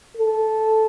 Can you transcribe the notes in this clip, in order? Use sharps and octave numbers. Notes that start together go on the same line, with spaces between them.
A4